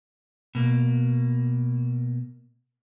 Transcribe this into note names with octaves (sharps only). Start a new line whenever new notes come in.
B2 A#3